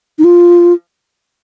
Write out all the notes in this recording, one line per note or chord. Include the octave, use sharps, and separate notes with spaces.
D#4
F4